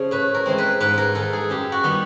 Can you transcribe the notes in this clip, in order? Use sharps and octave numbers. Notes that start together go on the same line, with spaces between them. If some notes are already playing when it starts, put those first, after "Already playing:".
Already playing: C#3 F3
A2 B4
A#4
E3 G#3 C4
B4
G#2 B4
A#4
D#3 G#3 A4
G#4
F#2 G4
F#4
D#3 G3 B3